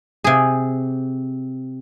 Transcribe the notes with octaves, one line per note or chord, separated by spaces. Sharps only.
C3 G#4